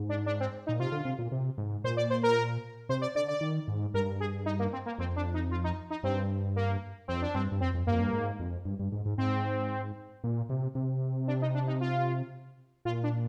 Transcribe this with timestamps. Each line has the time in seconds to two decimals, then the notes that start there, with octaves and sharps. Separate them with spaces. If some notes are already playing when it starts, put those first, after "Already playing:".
Already playing: G#2
0.09 D4
0.26 D4
0.40 C4
0.67 A#2 D#4
0.79 C3 F4
0.92 D3
1.05 C3
1.19 A#2
1.32 C3
1.58 G#2
1.84 A#2 C5
1.97 D5
2.10 C5
2.23 A#4
2.89 C3 C5
3.01 D5
3.15 D3 D5
3.28 D5
3.41 D#3
3.68 G#2
3.94 G2 A#4
4.20 G#4
4.46 D#4
4.59 A#3
4.73 C4
4.86 A#3
4.98 F2 C4
5.16 D4
5.34 D#4
5.51 F4
5.64 D#4
5.90 D#4
6.03 G2 C4
6.56 A#3
7.08 F2 C4
7.22 D4
7.34 G2 C4
7.52 G2
7.61 F2 C4
7.74 F2
7.87 G2 A#3
7.94 F2
8.01 G2
8.13 G#2
8.39 F2
8.65 G2
8.80 G2
8.92 G#2
9.06 G#2
9.18 G#2 C4
10.24 A#2
10.50 C3
10.75 C3
11.27 D4
11.42 D#4
11.54 D4
11.67 D#4
11.81 F4
12.85 A#2 F4
13.03 D4